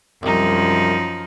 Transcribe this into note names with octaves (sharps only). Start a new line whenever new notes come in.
C2 F#2 F3 D#4